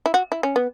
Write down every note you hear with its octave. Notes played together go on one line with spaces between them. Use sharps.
E4
F#4
E4
C#4
B3